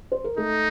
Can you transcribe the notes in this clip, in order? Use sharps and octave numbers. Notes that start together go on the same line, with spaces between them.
C5
A#4
A3 D#4 A4